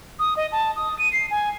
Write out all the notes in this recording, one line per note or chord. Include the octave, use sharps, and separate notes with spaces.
D#6
D#5
A5
D#6
D#7
C7
G#5